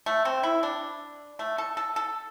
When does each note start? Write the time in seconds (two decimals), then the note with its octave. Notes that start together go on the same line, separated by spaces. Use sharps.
0.06 A3
0.25 C4
0.43 E4
0.63 D4
1.39 A3
1.58 A4
1.77 A4
1.96 A4